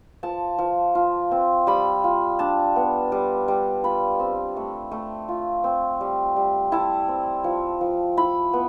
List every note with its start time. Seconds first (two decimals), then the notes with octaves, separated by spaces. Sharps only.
0.23 F3 A5
0.58 F3
0.95 F4
1.31 C4
1.67 G3 B5
2.04 F4
2.39 D4 A5
2.76 B3
3.12 G3
3.48 G3
3.84 F4 B5
4.20 C4
4.56 A3
4.91 A3
5.29 F4
5.64 C4
6.01 G3
6.36 G3
6.72 E4 A5
7.08 C4
7.44 F3
7.81 F3
8.17 E4 B5
8.53 B3